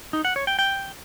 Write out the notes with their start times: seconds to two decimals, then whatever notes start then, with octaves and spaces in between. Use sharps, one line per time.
0.13 D#4
0.25 F#5
0.36 C#5
0.47 G5
0.59 G5